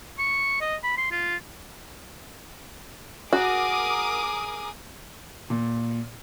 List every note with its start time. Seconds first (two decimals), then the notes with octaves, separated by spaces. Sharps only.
0.19 C#6
0.61 D#5
0.84 B5
0.98 C6
1.11 F4
3.33 F#4 G#4 A#4 D6 D#6
5.50 A#2